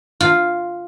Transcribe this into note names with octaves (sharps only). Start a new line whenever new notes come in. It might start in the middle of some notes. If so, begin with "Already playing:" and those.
F4